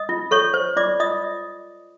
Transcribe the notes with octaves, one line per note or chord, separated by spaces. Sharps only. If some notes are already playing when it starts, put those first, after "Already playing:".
Already playing: D#5 D#6
F4
A4 C#5 C#6
C5
F4 D5 D6
F4 D#5 D#6